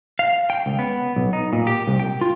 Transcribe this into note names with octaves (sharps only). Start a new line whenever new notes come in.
F5
G5
C#2
B3
B1
D#4
A#2
G4
C2
G5
F4